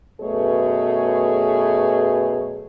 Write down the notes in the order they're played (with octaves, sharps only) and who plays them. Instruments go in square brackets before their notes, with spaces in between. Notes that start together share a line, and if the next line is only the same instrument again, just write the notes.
[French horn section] F#2 B2 A3 G#4 B4 C#5